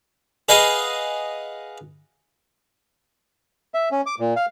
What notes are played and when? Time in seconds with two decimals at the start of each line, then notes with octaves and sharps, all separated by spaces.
0.49 G#4 B4 D#5 F5 F#5 G#5
3.74 E5
3.92 C#4
4.06 D6
4.20 A#2
4.36 F5